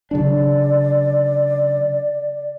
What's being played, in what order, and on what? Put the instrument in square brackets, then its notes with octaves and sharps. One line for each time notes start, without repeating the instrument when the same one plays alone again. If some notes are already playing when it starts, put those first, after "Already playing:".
[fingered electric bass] C#3 F#3 D4 [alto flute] D5